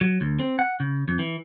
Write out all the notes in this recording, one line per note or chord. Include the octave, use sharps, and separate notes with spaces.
F#3
D2
C4
F#5
C#3
F2
E3